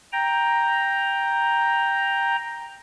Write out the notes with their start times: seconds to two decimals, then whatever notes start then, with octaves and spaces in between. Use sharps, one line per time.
0.12 G5 A#5